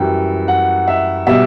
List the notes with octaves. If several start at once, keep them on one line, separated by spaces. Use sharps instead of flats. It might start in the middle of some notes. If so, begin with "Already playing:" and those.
Already playing: F#2 E3 G3 G5
F#5
E5
B2 G3 E5